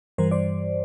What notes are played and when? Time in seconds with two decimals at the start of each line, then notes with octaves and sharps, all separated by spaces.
0.18 G2 E3 G3 A#4 C5
0.31 C5 D5